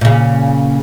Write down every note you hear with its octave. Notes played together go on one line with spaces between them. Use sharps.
A#2 C#3